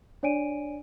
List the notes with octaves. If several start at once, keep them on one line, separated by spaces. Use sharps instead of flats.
D4 C#5 D5 G#5 D7 D#7